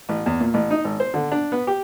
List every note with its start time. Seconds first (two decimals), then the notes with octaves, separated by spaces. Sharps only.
0.09 A1
0.26 E2
0.41 A#2
0.54 A1
0.71 D#4
0.85 G#1
1.00 C5
1.14 D3
1.32 D4
1.52 B3
1.67 G4